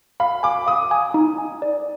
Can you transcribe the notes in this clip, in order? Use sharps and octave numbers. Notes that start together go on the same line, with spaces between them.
F5 B5
G#5 D6
F5 D#6
G#5
D#4
G#5
D5